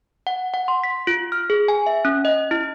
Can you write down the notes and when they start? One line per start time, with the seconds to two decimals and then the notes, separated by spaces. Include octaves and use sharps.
0.27 F#5
0.54 F#5
0.68 C6
0.84 B6
1.07 F4
1.32 F6
1.50 G#4
1.68 G#5
1.86 E5
2.05 C#4
2.25 D#5
2.51 E4